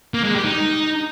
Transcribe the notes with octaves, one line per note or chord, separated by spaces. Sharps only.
A#3
G#3
G4
D#4